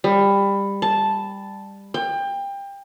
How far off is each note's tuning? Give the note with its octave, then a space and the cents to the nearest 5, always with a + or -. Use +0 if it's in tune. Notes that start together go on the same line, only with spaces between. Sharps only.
G3 +20
A5 -5
G5 +25